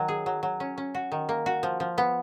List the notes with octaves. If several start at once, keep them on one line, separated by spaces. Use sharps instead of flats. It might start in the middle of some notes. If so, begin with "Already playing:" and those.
Already playing: D#3 F#3
G#4
F#3
F#3
C#4
C#4
F#4
D#3
A#3
F#4
F3
F3
B3